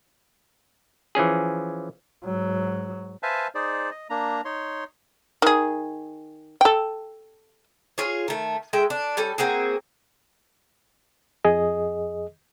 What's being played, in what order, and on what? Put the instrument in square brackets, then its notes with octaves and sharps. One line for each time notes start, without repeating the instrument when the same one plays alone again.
[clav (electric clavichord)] E3 F3 C#4 G#4
[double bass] G#2 F#3
[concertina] B4 C5 E5 F5 G#5 A5
D#4 G#4 C5 D5
D#5
A#3 D4 A#5
D#4 C#5 C6
[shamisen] D#3 G#4
A4 G5
[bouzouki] F4 G#4 C#5
D#3 A3
G#3 A3 E5 G5
D4
G3 C#4 A4
A#3 C4 F#4 G#4
[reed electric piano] F2 G#4 D#5